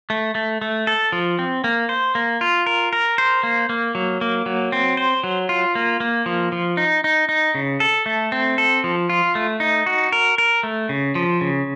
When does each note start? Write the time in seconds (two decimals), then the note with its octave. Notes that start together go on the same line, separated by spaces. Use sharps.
0.10 A3
0.35 A3
0.62 A3
0.87 A4
1.12 F3
1.39 C4
1.64 A#3
1.89 C5
2.15 A#3
2.41 F4
2.66 A#4
2.93 A#4
3.18 C5
3.43 A#3
3.69 A#3
3.95 F#3
4.21 A#3
4.46 F#3
4.72 C4
4.97 C5
5.24 F#3
5.49 F4
5.75 A#3
6.00 A#3
6.26 F3
6.52 F3
6.77 D#4
7.04 D#4
7.29 D#4
7.55 C#3
7.80 A4
8.06 A3
8.32 C4
8.58 A4
8.84 F3
9.09 F4
9.35 A3
9.60 D#4
9.86 F#4
10.12 A#4
10.38 A#4
10.63 A3
10.89 C#3
11.15 F3
11.41 C#3